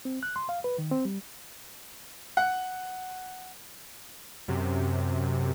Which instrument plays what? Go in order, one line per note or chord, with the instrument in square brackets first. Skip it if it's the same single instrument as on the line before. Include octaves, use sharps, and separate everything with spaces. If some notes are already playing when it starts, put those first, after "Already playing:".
[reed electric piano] C4
F#6
C6
F5
B4
D#3
C4
G3
[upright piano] F#5
[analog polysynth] F#2 C3